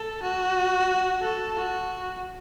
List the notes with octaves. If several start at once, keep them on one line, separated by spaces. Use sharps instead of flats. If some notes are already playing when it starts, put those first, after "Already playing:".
Already playing: A4
F#4
A4
F#4